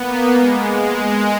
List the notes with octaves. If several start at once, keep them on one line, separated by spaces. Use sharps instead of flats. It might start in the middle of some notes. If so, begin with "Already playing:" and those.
Already playing: A#3 B3
G#3
G#3